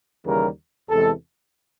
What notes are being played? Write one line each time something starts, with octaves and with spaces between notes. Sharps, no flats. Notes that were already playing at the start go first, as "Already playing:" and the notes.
D#2 C#3 E3 G3 A#4
E2 C3 E3 G#3 A4